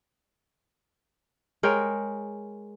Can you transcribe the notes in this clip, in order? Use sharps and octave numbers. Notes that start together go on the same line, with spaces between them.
G#3 A#4 C#5 G5